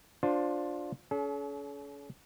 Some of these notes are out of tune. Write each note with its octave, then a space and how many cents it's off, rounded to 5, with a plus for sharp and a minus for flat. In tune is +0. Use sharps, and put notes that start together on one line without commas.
D4 +0 F4 +20 C5 +0
C#4 +35 A4 -45